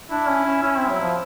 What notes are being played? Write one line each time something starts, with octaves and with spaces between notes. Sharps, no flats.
D4 E4
C#4
C#4
C#4 E4
C4
F#3
F3